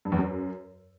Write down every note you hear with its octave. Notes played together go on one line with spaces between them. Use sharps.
G2
E2
F#2